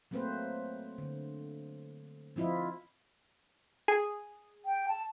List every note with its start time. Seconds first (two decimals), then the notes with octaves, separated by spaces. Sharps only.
0.11 F#3 A3 A#3 C4 B4 C5
0.98 D3
2.36 F3 C4 E4 F4 D#5
3.88 G#4
4.66 G5
4.89 A5